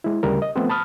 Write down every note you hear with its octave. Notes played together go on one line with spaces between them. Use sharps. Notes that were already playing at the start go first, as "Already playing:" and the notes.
G#3 E4
D2 C#3 G3 A#4
D#5
F3 A3 B3 C4 C5
A5 B5 D#6 F6